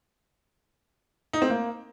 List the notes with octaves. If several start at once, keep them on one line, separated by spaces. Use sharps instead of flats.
D#4
C4
A#3